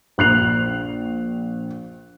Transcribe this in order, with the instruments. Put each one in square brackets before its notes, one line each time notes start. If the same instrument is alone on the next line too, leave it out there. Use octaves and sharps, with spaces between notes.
[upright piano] A#1 F#6 C7 F7